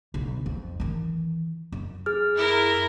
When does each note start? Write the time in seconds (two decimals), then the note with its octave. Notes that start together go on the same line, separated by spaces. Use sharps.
0.14 B1 D3
0.46 F2
0.80 D#3 E3
1.72 F#2
2.06 G#4 F6
2.37 E4 A#4